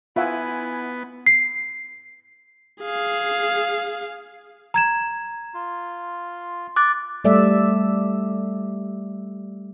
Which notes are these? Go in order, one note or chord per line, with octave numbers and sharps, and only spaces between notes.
B3 E4 F4 E5 F#5 G#5
C7
G#4 F5
A#5 G#6 E7
F4
D6 F#6 A6
G3 A3 D5 E5